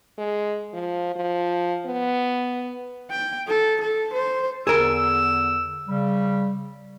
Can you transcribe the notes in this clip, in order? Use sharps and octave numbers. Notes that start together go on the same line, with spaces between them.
G#3
F3
F3
B3
G5
A4
A4
C5
E2 D3 G#4 A#4 E6
C#3 G3